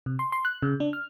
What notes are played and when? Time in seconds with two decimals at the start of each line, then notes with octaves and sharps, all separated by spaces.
0.06 C3
0.19 C6
0.32 C6
0.45 F#6
0.62 C#3
0.80 D4
0.93 F6